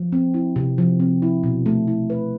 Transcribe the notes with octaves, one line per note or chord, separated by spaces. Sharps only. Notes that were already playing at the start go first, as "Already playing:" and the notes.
Already playing: F3
C4
E4
C3
F3
C4
E4
B2
A3
E4
B4